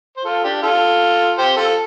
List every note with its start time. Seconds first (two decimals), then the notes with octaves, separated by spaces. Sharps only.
0.17 C5
0.24 F4 A4
0.44 D4 G4
0.62 F4 A4
1.38 G4 C5
1.57 F4 A4